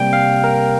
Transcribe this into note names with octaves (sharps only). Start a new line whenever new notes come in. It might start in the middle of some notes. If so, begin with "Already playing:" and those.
Already playing: C3 G3 A#3 G5
F5
A#4